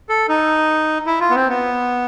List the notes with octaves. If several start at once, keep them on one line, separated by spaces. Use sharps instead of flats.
A4
D#4
E4
F4
B3
C4
B3